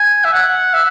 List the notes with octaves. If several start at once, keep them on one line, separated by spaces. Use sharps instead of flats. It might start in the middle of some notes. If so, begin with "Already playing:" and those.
Already playing: G#5
E5
F#5
E5